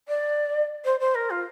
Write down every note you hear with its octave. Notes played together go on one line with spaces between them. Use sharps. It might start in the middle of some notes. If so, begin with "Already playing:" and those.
D5
C5
C5
A#4
F4